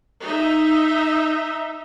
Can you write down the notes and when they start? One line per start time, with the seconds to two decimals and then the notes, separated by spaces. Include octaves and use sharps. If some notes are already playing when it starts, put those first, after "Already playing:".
0.23 D#4 E5